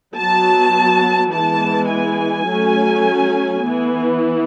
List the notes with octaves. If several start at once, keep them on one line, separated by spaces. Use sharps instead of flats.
F#3 B3 A5
E3 G#3 B3 A5
G#5
F#3 A3 C#4
E3 B3